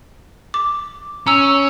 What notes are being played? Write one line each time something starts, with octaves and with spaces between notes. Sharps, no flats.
D6
C#4 A#5 E6